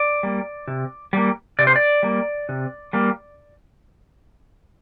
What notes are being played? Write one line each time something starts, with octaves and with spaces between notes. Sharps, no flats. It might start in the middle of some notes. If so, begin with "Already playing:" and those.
Already playing: D5
G3 A#3
C3
G3 A#3
C3 D5
C5
D5
G3 A#3
C3
G3 A#3